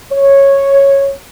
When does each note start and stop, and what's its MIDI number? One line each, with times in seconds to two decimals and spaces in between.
0.12 1.13 73